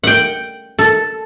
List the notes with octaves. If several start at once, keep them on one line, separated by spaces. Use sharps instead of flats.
F#5 G5
A4